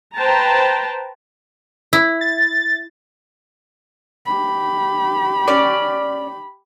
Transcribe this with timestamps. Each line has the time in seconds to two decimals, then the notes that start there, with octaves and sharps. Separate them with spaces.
0.17 B4 C5 G5 A5 A#5
1.93 E4
2.21 A6
4.26 G4 B5
5.48 C#4 D5